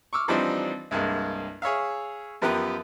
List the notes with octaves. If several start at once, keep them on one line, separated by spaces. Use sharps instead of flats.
C#6 D6 E6 F6
E3 F3 G3 C4 D4 D#4
C2 G2 G#3 A#3
G#4 C#5 E5 F5
F#2 F3 B3 G4 A#4 B4